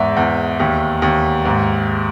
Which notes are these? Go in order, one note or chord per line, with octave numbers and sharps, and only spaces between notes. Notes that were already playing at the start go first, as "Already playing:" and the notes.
Already playing: E2 G#2 E5
E2
D#2
D#2
G#2